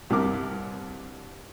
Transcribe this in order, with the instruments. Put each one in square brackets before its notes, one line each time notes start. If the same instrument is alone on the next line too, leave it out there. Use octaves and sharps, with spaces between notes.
[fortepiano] C2 G2 C3 A#4 D6 F6